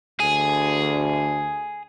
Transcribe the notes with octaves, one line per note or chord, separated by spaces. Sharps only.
D2 G#4